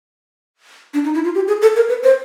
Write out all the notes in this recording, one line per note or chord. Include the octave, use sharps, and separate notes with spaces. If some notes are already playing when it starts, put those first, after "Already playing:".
D4
D#4
E4
F4
G4
G#4
A4
A#4
B4
C5